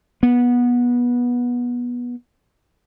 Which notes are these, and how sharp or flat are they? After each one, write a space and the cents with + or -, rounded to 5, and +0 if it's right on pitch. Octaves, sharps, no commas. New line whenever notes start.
B3 -20